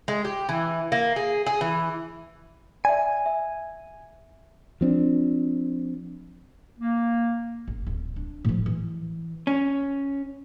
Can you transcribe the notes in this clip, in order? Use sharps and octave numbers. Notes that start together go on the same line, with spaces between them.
G#3
G4
E3
A#3
G#4
G#4
E3
D5 E5 G#5
E5
F3 C4 D4
A#3
A1
D1
D4
A2 F3
E3
C#4